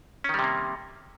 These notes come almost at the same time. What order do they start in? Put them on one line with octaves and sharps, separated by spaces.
C#4 D#3 G3 C3 A#3